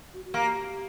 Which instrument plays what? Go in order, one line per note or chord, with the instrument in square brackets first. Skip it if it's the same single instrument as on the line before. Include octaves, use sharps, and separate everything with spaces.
[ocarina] F#4
F#4
[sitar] A#3 [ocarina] G4